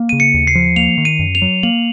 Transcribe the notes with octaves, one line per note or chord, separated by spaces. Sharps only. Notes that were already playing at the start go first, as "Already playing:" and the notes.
Already playing: A#3
C#3 D#7
C#7
D#2
C7
F3
A#3 F7
D#3
D#7
F#2
F7
F#3
A#3 F#7